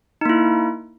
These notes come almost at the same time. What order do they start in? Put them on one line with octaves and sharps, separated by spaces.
D#4 A#3 E4